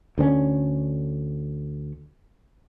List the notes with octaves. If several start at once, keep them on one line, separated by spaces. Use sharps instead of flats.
D2 D3 C4 C#4